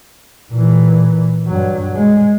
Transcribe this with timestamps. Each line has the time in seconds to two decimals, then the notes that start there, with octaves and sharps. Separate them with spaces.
0.52 A#2 E3
1.46 G2 F#3
1.95 G#3